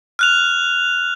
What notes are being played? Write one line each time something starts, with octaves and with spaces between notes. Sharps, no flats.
F6 F#6 F7